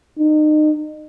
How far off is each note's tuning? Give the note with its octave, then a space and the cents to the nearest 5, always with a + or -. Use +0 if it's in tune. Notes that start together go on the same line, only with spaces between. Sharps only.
D#4 -30